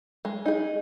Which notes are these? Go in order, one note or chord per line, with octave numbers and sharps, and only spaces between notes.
G#3
D#4 G#4